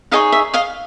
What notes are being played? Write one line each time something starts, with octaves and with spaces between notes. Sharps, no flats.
D#4 G#4 C#5 D#5 F5
E5
D#5 F5